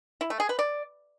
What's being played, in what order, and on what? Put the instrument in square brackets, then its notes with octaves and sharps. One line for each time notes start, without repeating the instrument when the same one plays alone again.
[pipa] E4
A3
G#4
B4
D5